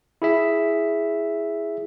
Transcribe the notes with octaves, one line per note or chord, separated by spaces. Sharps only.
E4 G#4 E5